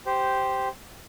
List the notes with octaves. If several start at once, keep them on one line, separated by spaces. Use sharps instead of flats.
G4 C5